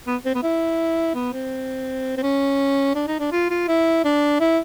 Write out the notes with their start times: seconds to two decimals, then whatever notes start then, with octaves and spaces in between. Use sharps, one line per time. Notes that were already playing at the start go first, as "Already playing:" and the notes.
0.07 B3
0.25 C4
0.34 B3
0.43 E4
1.15 B3
1.33 C4
2.17 C4
2.23 C#4
2.95 D4
3.07 D#4
3.20 D4
3.32 F4
3.50 F4
3.68 E4
4.05 D4
4.40 E4